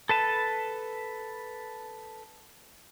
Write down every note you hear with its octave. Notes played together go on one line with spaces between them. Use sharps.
A4 B4 A5